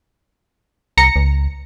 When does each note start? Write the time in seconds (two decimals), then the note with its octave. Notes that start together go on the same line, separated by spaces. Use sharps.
0.97 C2 A#5 A#6 C#7
1.16 C#2